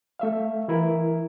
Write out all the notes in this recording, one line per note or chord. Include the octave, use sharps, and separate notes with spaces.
A3 E5 F5
E3 E4 A#4